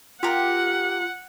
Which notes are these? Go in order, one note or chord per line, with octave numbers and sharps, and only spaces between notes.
F4 G4 A#4 F#5